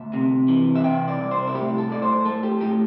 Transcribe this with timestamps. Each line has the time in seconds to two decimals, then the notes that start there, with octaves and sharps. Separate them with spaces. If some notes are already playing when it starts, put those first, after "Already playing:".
Already playing: D2 E5
0.13 C3
0.48 E3
0.76 E5
0.84 C3 G5
1.08 D5
1.19 C2
1.31 C5
1.47 E4
1.55 A2 G4
1.78 A4
1.90 A2 D5
2.02 C5
2.25 A3 A4
2.43 G4
2.61 A2 G4